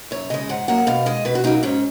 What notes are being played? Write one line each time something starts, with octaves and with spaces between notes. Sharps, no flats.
F#2 C#5
C#3 G#3 D#5
G#2 F#5
F#3 A#3 F#5
B2 F5
G#3 D#5
B2 B4
F#4
F#3 A#3 D#4
G#2 C#4